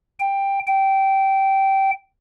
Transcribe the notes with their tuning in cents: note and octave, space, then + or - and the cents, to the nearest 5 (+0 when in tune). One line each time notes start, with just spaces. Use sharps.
G5 +10
G5 -15